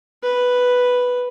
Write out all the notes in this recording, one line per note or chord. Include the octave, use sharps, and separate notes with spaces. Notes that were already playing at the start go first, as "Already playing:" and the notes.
B4